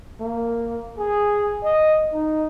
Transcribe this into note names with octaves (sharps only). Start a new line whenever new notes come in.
A#3
G#4
D#5
D#4